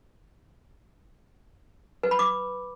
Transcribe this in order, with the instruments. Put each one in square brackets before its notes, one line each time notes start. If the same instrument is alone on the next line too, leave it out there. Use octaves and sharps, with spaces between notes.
[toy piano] B4
B5
D6